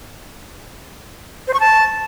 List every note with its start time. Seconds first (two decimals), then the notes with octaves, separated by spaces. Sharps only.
1.47 C5
1.54 C#6
1.60 A5